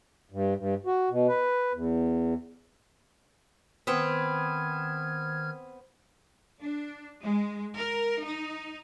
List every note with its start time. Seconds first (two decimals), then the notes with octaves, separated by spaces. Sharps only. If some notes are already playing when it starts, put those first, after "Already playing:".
0.32 G2
0.56 G2
0.86 F#4
1.10 B2
1.28 B4
1.73 E2
3.87 D#3 B3 C4 F6 G#6
6.59 D4
7.22 G#3
7.75 A#4
8.24 D#4